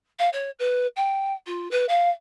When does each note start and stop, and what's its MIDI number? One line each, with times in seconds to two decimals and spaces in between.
0.19 0.29 77
0.33 0.50 73
0.59 0.87 71
0.96 1.33 79
1.46 1.70 65
1.71 1.85 71
1.89 2.09 77